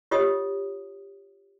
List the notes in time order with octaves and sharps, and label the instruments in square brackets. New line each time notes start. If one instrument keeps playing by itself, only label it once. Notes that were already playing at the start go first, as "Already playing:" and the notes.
[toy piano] F4 G4 C#5 D#5 D#6